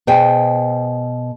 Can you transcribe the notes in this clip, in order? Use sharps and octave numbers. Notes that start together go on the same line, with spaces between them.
B2 G#4 C5 G5 G#5